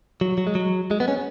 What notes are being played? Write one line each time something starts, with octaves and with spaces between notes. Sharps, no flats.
F#3
F#3
G#3
F#3
G#3
B3
C#4